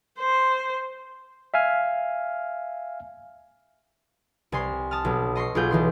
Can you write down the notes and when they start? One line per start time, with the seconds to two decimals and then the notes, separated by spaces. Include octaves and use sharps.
0.19 C5
1.54 E5 F5 G#5 F6
4.52 C2 G#5 C6 C7
4.91 A5 D#6 F6
5.05 B1
5.36 D#5 C6 C#6 C7
5.55 B1 F4 G#4 G6
5.71 B1 E3 C6